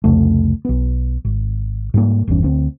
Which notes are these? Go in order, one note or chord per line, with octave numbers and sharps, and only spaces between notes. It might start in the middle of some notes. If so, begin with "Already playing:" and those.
C2 F2 C#3 A3
B1 B3
G#1
G#2 G3 A#3
G1 E2 E3 C#4
D2 B3 C4